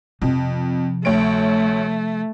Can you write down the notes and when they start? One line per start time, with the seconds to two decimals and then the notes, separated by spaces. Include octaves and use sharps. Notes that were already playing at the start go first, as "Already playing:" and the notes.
0.22 F2 C3 F3
1.05 D2 A3 C#5 D7